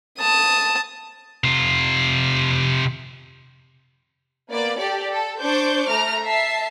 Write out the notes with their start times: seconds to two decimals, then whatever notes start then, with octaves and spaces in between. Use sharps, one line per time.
0.19 A5 D#6
1.44 C3 F4
4.50 A#3 B3 D5
4.78 G4 A4 D5
5.10 A4
5.41 D4 C5 C#6 D6 G6
5.89 A3 A#5 F6
6.24 E5 A5 C7